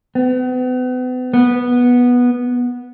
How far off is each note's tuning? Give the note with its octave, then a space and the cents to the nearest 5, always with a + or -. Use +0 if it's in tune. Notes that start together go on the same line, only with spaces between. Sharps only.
B3 +40
B3 -10